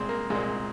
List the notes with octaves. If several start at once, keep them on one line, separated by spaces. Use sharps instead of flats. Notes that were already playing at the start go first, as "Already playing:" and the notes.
Already playing: C2 A#2 G#3 C4
A#3
C2 A#2 G#3 C4